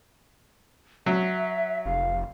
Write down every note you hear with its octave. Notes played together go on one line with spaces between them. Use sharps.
F#3 E5
F1 F5